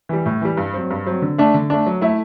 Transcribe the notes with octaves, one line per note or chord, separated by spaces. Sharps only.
E3 G3
A2
E3 G3
G2
F#3 C4
G2
F#3 C4
D3
A3 D4
D3
A3 D4
F#3
A3 E4